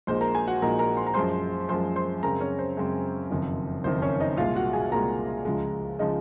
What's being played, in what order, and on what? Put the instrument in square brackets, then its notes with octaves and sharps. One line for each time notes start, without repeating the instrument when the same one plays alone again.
[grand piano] A#1 A#2 G#3 D#4 C5 C6
A#4 A#5
G#4 G#5
F#4 F#5
A#1 A#2 G#3 D#4 A#4 A#5
A#4 A#5
C6
A#5
F#2 F3 G#3 C5 C6
F#2 F3 G#3 C5 C6
C5 C6
F#2 C#3 G#3 C4 A#4 A#5
C#4 C#5
C5
F#2 C#3 G#3 C4
F#1 F2 D#3
F#1 F2 D#3 C5
C#4 C#5
D#4 D#5
C2 A#2 G#3 F4 F5
F#4 F#5
G#4 G#5
C2 A#2 G#3 A#4 A#5
C#2 C#3 F3 G#3
C#3 F3 G#3 D#4 D#5